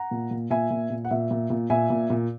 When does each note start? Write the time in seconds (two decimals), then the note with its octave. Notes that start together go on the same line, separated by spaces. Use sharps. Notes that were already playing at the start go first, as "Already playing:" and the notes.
Already playing: F#5 A#5
0.11 A#2
0.31 A#2
0.50 A#2 E5 G#5
0.70 A#2
0.90 A#2
1.05 F#5
1.11 A#2 E5
1.31 A#2
1.50 A#2
1.70 A#2 E5 G#5
1.90 A#2
2.10 A#2